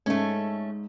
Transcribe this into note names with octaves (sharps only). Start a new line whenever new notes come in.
G#2 A3 C#4